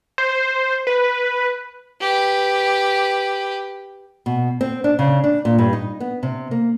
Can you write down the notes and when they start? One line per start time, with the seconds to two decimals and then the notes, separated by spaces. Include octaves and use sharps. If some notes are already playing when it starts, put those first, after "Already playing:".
0.18 C5
0.87 B4
2.01 G4 B4
4.26 B2
4.61 C4
4.84 D4
4.99 C#3
5.24 D4
5.45 A#2
5.58 G2
5.73 D#4
6.00 B3
6.23 C3
6.51 A#3